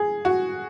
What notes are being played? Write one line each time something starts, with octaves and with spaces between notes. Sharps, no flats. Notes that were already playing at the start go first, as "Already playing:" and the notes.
Already playing: G#4
F#4